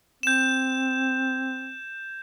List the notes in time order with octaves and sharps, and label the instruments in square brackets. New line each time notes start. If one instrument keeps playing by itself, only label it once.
[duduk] C4 [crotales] G6 E7